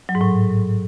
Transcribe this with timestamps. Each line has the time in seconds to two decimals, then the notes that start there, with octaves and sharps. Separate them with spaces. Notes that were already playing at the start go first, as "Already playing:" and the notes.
0.09 F#3
0.15 G#2
0.21 A2